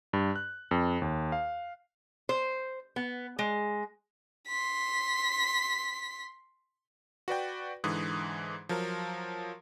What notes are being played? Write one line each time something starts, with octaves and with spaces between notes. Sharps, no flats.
G2
F#6
F2
D#2
F5
C5
B3
G#3
C6 B6
F#4 B4 D5 G5
G#2 D3 E3 D#6
F3 F#3 A#4